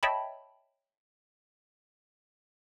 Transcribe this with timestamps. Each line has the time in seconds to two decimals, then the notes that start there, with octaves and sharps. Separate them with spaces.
0.03 C#5 D#5 E5 G5 A5 B5